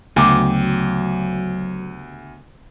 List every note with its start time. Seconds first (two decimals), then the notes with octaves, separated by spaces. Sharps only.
0.16 D2 C#3 F#3 A3 B3 G4